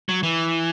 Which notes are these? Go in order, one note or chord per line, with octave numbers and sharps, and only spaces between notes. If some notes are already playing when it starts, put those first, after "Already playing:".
F#3
E3